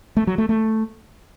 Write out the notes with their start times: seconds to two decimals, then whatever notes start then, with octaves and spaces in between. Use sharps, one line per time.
0.17 A3
0.27 F#3
0.38 A3
0.49 A3